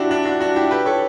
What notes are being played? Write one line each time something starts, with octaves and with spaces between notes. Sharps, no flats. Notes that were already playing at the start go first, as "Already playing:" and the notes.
Already playing: D4 E4 F#4 G4
D4
D4 F#4
D4 F#4
E4 G4
G4 B4
A4 C#5